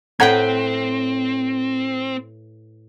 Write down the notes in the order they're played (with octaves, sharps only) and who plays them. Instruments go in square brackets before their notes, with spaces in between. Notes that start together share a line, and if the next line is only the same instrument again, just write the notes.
[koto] A2 B4 G5 [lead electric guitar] C4 [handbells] F#5 A#5 G#6